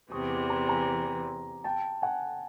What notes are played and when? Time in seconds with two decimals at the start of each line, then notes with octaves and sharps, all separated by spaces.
0.11 E2 C3 E3 C#6 D#6
0.30 C6 D6
0.50 A#5 C6
0.68 G#5 A#5
1.64 G5 A5
2.02 F#5 G#5